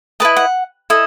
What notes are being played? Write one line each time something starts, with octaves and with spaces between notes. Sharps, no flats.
E4 B4 D#5 A5
F#5
E4 A4 D#5